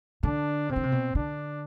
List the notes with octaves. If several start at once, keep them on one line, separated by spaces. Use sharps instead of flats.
D3 D4
C3 C4
D3
C3
B2
D3 D4